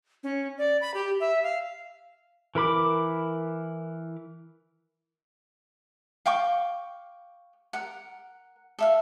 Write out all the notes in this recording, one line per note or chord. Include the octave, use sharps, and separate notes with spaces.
C#4
D5
B5
G4
E5
F5
E3 A#4 B5 D6
F5 G5 C#6 D6
A#4 F#5
A4 E5 F5